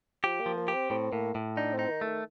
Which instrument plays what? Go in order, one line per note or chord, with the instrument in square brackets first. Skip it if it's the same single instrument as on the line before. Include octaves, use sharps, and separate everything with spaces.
[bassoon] F3 [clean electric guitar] G4
[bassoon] A#3
[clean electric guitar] F3
[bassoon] A#3
[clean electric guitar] G4
[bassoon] C4
[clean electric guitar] A2 [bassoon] C4
[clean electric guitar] A2 [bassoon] A#3
[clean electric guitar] A2
[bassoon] D4 [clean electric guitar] D#4
[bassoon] C4
[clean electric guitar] D#4
[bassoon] D#3
[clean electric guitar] A3
[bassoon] D#3